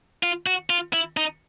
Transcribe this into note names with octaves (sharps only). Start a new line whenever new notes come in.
F4
F#4
F4
E4
D#4